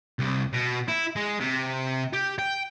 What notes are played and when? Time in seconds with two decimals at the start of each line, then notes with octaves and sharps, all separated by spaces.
0.19 C2
0.53 B2
0.88 E4
1.16 G#3
1.40 C3
2.13 G4
2.39 G5